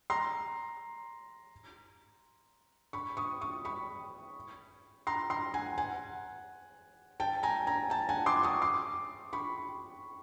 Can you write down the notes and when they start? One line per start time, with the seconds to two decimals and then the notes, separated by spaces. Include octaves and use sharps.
0.10 A#5 C6
2.93 B5 C#6
3.17 C#6 D#6
3.41 C#6 D#6
3.65 B5 C#6
5.07 A#5 C6
5.30 A#5 C6
5.54 F#5 G#5
5.78 F#5 G#5
7.20 G5 A5
7.43 G#5 A#5
7.67 G#5 A#5
7.90 G5 A5
8.09 F#5 G#5
8.26 C6 D6
8.43 C#6 D#6
8.62 C6 D6
9.33 B5 C#6